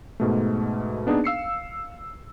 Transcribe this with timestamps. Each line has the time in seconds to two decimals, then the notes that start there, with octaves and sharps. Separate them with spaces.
0.20 G#2 B2 A3
1.06 A#3 B3 D4 D#4 G#4
1.24 F5 E6 C7 C#7